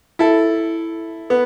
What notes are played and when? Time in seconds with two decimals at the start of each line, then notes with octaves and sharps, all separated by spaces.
0.19 E4 A4
1.30 B3